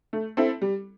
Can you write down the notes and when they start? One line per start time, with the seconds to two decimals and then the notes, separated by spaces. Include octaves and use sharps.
0.13 A3
0.37 C4 E4 A4
0.62 G3